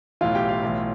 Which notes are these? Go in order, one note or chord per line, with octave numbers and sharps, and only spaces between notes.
B1 A2 E3 F4 F5
G4 G5
F4 F5
B1 A2 E3